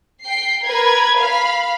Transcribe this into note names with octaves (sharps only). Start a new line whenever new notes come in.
G5 C7
A#4 B4 G#6
F5 B5